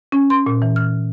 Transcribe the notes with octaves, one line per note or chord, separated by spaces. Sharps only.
C#4
C6
A#2
E3
F6